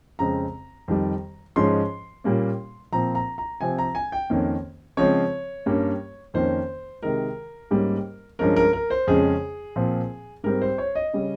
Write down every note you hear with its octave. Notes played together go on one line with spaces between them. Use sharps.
F2 C#3 G#3 C4 A#5
F2 D#3 G3
G#2 F3 G#3 C#4 C6
A#2 G3 A#3 C#4
A#2 F3 C4 A#5
A#5
A#5
C3 F3 C4 G#5
A#5
G#5
G5
F2 D#3 A#3 C#4
C#3 F3 G#3 C4 C#5
G2 G3 A#3 C#4
F2 D#3 A#3 C#4 C5
C3 D#3 G#3 A#4
G#2 G3 A#3 C#4
G2 F3 G#3 C#4 A#4
A#4
A#4
C5
F2 C#3 G#3 C#4 G#4
A#2 F3 C4
G#2 G3 C4 A#4
C5
C#5
D#5
C#3 G3 C#4